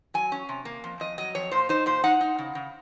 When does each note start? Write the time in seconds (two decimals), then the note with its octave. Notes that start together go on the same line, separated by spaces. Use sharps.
0.14 F#3 G#5
0.32 C#4
0.49 C3
0.65 A#3
0.84 F2
1.00 F2 D#5
1.18 F#3 D#5
1.35 F2 C#5
1.51 A#2 C5
1.69 D#4 C5
1.86 A#2 C5
2.04 D#4 F#5
2.21 D#4
2.39 C#3
2.55 C#3